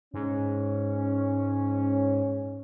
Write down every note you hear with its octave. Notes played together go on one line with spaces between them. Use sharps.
G#2 C#4